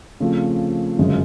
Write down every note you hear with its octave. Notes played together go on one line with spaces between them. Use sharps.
C#3 F3 A3 C4
G1 F#2 C#3 F3 G#3